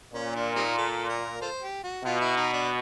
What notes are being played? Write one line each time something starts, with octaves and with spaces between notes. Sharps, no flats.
A#2 C#4
D4
G3 C4 D#4
A4
A#4
F4 A4 C5
G4
F#4
B2 F4
E4
D#4
D4